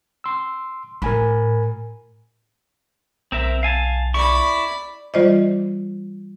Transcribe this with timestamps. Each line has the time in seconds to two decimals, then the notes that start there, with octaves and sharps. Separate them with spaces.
0.24 C6 E6
1.02 A2 A#4 G#5 B5
3.32 B1 C4 A#4 E5
3.63 F5 G#5 A5
4.14 E4 D5 B5 C#6
5.14 E3 G3 F4 C5 D5 D#5